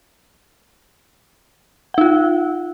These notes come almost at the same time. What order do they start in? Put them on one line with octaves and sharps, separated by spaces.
F#5 D#4 F4